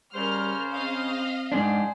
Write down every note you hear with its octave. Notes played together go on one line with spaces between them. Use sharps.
C#3 G3 A#4 C5 F6
C4 D#5 F5
G#2 D4 G#4 C5